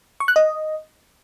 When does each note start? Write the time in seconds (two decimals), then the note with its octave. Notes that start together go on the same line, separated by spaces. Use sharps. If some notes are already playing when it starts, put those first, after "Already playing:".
0.20 C#6
0.28 F#6
0.36 D#5